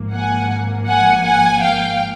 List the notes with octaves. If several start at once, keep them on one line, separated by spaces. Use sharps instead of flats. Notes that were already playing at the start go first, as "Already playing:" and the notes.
Already playing: G#1 G#2 F3 A#3
F#5 G#5
F#5 G#5
F#5 G#5
F5 G5